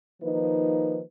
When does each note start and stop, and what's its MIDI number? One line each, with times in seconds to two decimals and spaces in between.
0.22 1.01 51
0.22 1.01 53
0.22 1.01 58
0.22 1.01 63
0.22 1.01 71